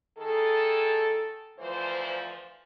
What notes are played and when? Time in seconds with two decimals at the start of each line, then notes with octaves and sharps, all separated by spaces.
0.17 D#3 G#4 A4
1.59 D2 E3 F3 C5